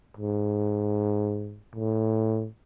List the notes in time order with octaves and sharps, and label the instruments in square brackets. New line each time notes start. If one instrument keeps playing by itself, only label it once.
[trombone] G#2
A2